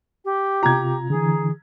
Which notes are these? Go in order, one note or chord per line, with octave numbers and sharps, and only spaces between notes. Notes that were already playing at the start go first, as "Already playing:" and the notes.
G4
C3 F4 A#5 G#6
D3 E3 G#4